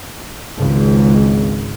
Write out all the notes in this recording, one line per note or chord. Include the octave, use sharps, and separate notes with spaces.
G#1 C#2 G#2